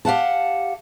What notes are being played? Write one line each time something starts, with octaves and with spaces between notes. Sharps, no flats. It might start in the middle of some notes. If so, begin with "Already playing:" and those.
G4 F5 F#5 A5